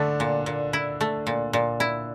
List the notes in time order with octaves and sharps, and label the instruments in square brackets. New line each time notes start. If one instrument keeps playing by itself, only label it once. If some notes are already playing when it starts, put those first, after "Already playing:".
Already playing: [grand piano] D3 D4 [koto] A3
[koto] A#2
A#2
E4
A3
A#2
A#2
E4